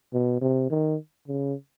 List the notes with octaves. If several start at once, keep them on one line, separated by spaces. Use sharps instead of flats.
B2
C3
D#3
C#3